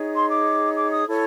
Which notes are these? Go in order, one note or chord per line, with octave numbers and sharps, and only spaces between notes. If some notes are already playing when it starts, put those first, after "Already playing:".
Already playing: D#4 G#4 C#5
C6
D6
D6
D#6
E4 A4 C#5